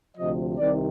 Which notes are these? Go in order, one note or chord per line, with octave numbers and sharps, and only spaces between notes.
D2 C3 F3 D#5
C2 C3 D#3 D5